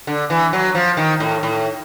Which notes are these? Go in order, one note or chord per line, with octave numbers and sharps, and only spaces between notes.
D3
E3
F#3
F3
D#3
A2
A2